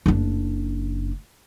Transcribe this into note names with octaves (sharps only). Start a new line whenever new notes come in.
F#1 D4